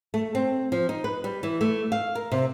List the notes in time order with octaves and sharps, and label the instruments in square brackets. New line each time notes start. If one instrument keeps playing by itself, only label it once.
[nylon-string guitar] A3
C4
F3
D#4
B4
G3
E3
A3
F5
A#4
C3